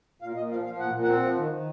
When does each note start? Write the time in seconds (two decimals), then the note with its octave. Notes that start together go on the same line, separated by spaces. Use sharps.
0.22 A#2 F5
0.36 A#2 D#5
0.51 F3 F5
0.65 F3 F5
0.79 A#2 F#5
0.94 A#2
1.03 F#5
1.08 C4
1.23 F3
1.37 D#3
1.51 D#3